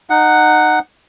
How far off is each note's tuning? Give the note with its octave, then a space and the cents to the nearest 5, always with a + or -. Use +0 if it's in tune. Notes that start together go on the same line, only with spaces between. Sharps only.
D#4 -20 F#5 +0